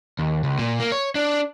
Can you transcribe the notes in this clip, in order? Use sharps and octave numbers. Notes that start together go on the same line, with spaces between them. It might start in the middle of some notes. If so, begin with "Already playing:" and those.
D#2
C#2
A#2
A#3
C#5
D4